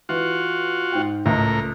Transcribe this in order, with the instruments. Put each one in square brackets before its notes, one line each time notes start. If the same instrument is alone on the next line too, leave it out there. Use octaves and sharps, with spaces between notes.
[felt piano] E3 [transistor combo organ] F4 F#4
[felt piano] G#2 G5
[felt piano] C#2 A3 [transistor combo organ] A2 A#4